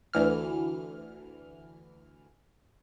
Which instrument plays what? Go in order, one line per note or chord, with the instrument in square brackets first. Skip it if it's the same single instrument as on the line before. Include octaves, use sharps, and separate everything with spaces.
[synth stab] D2 E3 F6